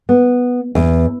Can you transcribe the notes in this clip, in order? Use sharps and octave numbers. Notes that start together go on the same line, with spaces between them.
B3
E2